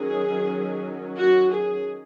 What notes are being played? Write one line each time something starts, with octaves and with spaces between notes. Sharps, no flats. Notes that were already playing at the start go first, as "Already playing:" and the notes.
Already playing: D#3 F#3 C#4 G#4
F#4
G#4